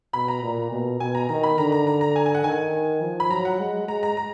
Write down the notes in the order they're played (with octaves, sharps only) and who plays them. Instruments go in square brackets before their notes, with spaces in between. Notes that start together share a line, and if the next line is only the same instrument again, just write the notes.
[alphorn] B2 [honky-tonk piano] B5
[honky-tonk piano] A#5
[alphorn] A#2
B2
[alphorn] B2 [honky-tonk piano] G#5
[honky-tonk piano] A#5
[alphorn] D#3 [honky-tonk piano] A#5
[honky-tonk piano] B5
[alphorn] D3 [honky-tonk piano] A#5
[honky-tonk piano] A#5
A#5
A#5
G#5
G#5
F#5
[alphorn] D#3 [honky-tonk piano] G#5
[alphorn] F3
[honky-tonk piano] B5
[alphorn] F#3 [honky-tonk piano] A#5
[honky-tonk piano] F#5
[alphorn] G#3
[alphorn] G#3 [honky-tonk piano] A#5
[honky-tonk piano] A#5
A#5